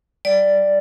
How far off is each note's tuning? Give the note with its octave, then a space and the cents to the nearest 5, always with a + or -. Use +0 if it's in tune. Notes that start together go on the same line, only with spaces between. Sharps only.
G3 -15 D5 +0